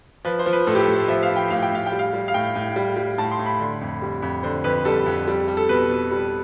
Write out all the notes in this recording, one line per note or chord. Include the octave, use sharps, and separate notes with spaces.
F3 B4
C5
F3
B4
A2 A4
G4
A4
A2
C5
F3 E5
F5
F3
G5
A2 F5
G5
A2 F5
G5
G3
F5
G3
F5
A2 G5
A2
G3
G3
A2 A5
C6
A2
B5
D3
F2
G3
F2
D3 C5
F2 B4
G3 A4
F2
G3
G3
A4
B2 B4
B2
G3